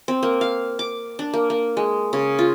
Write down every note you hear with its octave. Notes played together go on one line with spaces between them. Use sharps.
C4
A#3
F5
D6
D4
A#3
A#3
G#3
C#3
F4